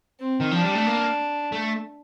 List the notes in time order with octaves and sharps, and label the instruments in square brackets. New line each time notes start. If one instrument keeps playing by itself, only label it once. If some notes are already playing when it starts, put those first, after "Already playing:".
[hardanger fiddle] C4
[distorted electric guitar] D#3
[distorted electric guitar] F3 [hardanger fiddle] D4
[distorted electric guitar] G3
A3
A#3
A3